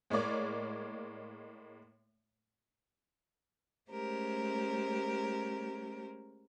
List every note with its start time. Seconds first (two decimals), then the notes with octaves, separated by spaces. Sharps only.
0.10 A2 G#3 A#3 C#5 D5
3.91 G#3 A3 C#4 G4 A#4 C5